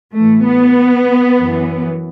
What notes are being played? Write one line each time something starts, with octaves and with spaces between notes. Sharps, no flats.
A2 E3 A3
B3
F#2 E3